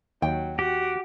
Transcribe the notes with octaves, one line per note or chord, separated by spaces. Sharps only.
D#2 F#3 G5
F#4 G4